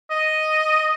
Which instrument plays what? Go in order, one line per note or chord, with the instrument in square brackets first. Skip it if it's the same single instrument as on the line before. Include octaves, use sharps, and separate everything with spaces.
[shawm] D#5